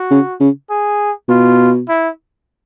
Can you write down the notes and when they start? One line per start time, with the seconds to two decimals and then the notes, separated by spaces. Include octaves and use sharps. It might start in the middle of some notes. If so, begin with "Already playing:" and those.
Already playing: F#4
0.11 C#3
0.40 C#3
0.70 G#4
1.29 B2 F4
1.88 E4